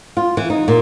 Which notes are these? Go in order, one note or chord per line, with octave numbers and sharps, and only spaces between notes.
F4
E3
D#4
A#2